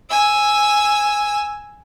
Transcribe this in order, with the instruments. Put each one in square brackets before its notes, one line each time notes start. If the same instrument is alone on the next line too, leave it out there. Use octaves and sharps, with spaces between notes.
[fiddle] G#5 E6